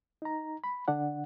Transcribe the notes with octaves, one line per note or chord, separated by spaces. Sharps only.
D#4 A#5
B5
D3 D4 F#5